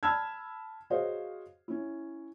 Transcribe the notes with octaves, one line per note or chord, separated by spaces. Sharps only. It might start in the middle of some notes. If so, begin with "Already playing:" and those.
A5 B5 E6 F6 G#6
F#4 G#4 C5 C#5 D#5 F5
C#4 E4